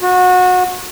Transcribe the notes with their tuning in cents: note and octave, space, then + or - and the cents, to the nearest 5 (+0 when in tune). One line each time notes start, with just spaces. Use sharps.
F#4 -25